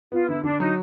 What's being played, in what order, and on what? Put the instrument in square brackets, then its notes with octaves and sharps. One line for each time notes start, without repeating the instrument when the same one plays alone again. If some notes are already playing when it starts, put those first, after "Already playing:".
[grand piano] B3 [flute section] F4
[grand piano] D3 [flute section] E4
[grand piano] D3 [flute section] D4
[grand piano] F#3 [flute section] D#4